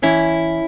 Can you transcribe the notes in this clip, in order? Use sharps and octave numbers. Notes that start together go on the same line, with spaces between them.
E3 C#4 E4